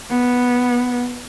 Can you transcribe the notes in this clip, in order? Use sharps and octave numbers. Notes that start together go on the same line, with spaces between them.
B3